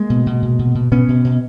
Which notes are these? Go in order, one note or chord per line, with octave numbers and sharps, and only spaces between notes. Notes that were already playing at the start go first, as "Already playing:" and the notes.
Already playing: G#3 A#3
B2
B2
B2
B2
B2
B2 B3 C#4
B2
B2